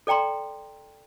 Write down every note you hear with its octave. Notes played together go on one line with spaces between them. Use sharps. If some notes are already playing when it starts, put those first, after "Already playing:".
A4 D5 G5 A#5 C6